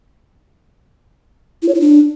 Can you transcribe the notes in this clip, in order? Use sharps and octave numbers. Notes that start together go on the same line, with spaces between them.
E4
C#5
E4
D4